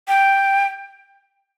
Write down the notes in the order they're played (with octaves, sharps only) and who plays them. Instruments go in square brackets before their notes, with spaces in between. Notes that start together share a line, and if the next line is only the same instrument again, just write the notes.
[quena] G5